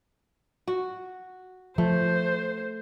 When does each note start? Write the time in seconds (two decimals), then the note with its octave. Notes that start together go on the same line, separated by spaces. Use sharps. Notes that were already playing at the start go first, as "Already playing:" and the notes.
0.68 F#4
1.78 F3 A3 C5